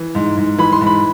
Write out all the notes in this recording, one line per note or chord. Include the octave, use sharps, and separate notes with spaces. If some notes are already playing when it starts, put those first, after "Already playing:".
Already playing: E3
G#2
G#2
E3 B5
C6
G#2
B5